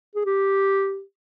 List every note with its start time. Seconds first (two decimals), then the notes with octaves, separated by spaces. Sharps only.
0.15 G#4
0.25 G4